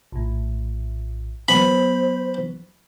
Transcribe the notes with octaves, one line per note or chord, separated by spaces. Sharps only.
A#1 A2
F#3 B3 C5 B5